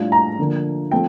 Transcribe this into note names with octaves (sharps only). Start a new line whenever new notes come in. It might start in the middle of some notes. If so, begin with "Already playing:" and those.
Already playing: A2 G3 D4 F4
A#5
D3 F3 A#3
F3 A3 C4 G5